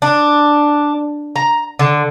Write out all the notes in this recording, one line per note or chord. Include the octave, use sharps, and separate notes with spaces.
D4
A#5
D3